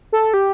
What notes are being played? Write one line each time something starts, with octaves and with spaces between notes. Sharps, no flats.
A4
G4